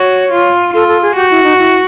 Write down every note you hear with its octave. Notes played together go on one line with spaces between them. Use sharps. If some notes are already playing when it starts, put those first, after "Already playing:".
Already playing: F#4 C#5
F4
F4 A4
A4
G#4
F#4 G4
E4
D#4
E4